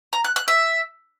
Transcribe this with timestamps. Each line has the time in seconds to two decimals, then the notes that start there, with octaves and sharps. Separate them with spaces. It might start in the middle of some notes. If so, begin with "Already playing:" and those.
0.13 A#5
0.24 F#6
0.36 F#6
0.48 E5